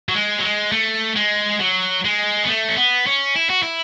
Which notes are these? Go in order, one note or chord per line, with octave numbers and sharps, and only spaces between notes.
F#3
G#3
F#3
G#3
A3
G#3
F#3
G#3
B3
A3
C#4
B3
C#4
E4
F#4
E4